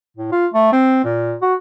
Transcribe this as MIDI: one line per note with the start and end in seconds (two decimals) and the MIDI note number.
0.17 0.31 45
0.32 0.46 65
0.54 0.72 57
0.72 1.02 60
1.04 1.34 46
1.41 1.54 66